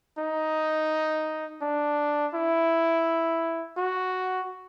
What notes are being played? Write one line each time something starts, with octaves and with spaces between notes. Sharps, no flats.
D#4
D4
E4
F#4